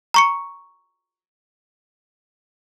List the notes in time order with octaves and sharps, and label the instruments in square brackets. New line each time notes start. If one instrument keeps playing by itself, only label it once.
[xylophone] A#5 C#6 C#7